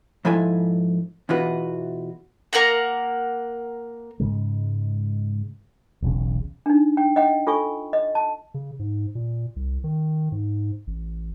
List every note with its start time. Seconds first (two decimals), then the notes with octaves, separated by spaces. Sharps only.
0.25 G#2 F3 E4 A4 G#5
1.29 E2 B2 E3 F4 F#4 B4
2.53 A#3 A#4 F#5 A#5
4.20 G#2 C#3 G#3
6.02 E1 B1 E2 C#3
6.66 D4 D#4
6.97 G5
7.16 D#5 F#5 G5
7.47 F4 A4 G#5 C#6
7.93 D#5
8.15 A5
8.54 C#3
8.79 G#2
9.15 A#2
9.56 C2
9.84 D#3
10.32 G#2
10.87 A1